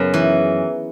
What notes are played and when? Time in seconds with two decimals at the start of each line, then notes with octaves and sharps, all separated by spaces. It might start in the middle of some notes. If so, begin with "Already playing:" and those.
Already playing: F#2 C#3 B3
0.14 E3